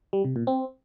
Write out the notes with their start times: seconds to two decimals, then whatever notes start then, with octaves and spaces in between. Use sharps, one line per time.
0.13 G3
0.24 C3
0.36 A#2
0.47 C4